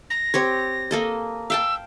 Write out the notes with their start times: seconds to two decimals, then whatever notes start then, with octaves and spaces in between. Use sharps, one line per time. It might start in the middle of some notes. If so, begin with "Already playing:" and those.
0.10 A#6
0.34 C4 G4 C#5
0.91 A#3 A4 D#5
1.50 F5 G5 A5 E6